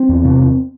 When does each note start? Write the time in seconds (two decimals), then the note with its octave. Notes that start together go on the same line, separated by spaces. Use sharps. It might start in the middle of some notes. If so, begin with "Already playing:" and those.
Already playing: C4
0.09 E2
0.24 C3
0.39 E2